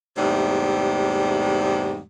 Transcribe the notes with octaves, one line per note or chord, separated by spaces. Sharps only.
E2 G#2 C3 G3 A3